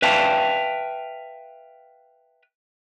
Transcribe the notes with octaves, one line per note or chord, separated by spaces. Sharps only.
B4 E5 F5 G5 A5